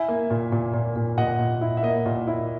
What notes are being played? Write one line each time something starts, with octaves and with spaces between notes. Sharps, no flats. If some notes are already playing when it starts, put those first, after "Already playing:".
Already playing: E4 E5 G#5
A#3
A#2
A#2
A#2
A#2
A#2 D#5 F#5
A#2
E4
E5
A#3 D#5
A#2
E4